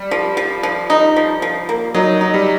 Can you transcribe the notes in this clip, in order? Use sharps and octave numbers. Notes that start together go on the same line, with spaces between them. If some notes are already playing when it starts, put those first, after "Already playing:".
Already playing: G3
F3
F3
F3
D#4
F3
F3
A#3
F#3 D#4
D#4
G3